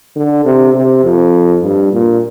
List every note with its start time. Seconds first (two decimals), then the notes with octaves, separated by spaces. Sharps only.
0.16 D3
0.45 C3
0.75 C3
1.04 F2
1.63 G2
1.92 A#2